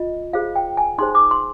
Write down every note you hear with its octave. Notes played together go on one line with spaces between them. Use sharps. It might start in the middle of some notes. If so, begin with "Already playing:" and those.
Already playing: F4 D#5
F4 G#4 C5 F5
G5
G#5
D#4 G#4 C5 C6
D6
C6